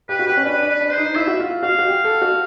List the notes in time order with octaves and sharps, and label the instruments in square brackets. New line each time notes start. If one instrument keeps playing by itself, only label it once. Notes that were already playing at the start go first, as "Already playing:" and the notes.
[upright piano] G4 [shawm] B4
[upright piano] F#4
[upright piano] G4 [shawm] B4
[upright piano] C#4
[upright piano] D4 [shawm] B4
[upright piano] D4
[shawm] B4
[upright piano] D4
[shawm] C5
[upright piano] D#4
[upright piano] E4 [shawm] E5
[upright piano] F#4
F4
[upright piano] F#4 [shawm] F5
[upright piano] F#4
G4
A4
F#4